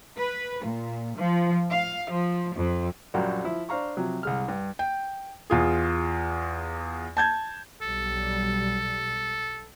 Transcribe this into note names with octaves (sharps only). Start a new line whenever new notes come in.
B4
A#2
F3
F5
F3
F2
A#1 F#2 G3 F#4 A#4 G5
F3 E4
D4 C5 F5 A#5 C#6
C3 F3 F#3
C2 G#3 F6
G2
G5
E2 F4 G#4
A5 G6 G#6
B1 G3 A4